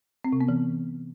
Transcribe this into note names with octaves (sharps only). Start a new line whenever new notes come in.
C4
C3
B3
E3